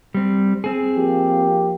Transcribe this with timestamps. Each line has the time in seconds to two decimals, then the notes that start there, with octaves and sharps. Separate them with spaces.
0.15 G3 C4
0.64 C4 G#4
0.96 F3 A#3 G4